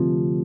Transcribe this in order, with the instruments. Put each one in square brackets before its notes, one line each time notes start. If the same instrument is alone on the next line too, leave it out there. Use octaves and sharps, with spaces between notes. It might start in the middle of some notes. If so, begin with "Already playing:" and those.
Already playing: [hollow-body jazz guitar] D2 C3 F3